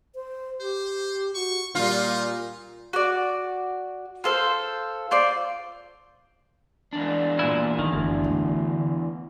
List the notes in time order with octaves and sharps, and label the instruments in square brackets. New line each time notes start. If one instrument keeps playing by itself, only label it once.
[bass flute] C5
[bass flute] G4 [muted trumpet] C5
[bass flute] F#4 [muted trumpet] C#6
[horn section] A#2 [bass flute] G3 [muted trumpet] D#4 [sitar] F4
[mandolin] F#4 D5
F4 A4 C5
F4 C5 D5
[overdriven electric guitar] E2 D4
[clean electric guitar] A#2 E3 E4
[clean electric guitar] D#3 [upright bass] G#3
[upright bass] F#1 [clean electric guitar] D2
[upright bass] A3